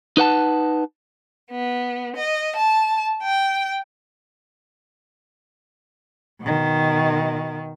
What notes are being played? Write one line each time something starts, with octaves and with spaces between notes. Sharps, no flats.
D#4 B4 F#5 A5
B3
D#5
A5
G5
B2 D#3